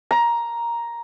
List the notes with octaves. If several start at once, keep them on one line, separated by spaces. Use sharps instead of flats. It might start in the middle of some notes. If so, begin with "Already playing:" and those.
A#5